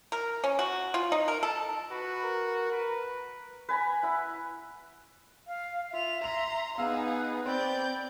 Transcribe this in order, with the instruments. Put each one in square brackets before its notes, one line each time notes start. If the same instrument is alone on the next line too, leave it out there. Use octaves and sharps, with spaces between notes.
[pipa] A#4
C#4
F#4
F4
D#4
A#4
A4
[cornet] F#4 [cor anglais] B4
[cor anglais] A#4
[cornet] B4
[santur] B4 G#5 A#5 B5
E4 F#5
[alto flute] F5
[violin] F4 F7 [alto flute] E5
[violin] A#5 C6 [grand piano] F7
[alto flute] B3 [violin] D#4 G#4 [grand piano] F5 E6
[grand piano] C4 [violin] D5 G6 [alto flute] B5